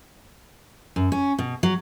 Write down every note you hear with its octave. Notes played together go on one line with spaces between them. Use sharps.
F#2
C#4
B2
F#3